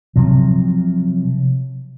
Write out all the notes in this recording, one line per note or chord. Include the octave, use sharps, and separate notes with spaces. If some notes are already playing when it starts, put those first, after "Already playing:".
C3 F3 F#3